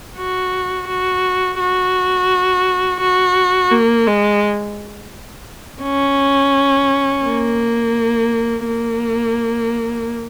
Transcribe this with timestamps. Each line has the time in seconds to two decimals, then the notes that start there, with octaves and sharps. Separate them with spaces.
0.17 F#4
0.88 F#4
1.59 F#4
3.01 F#4
3.71 A#3
4.07 G#3
5.83 C#4
7.25 A#3
8.66 A#3